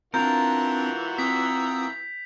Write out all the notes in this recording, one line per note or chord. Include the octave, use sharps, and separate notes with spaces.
E3 C4 D4 F4 F#4 A#4 G6 F7
C4 D#6 E6 B6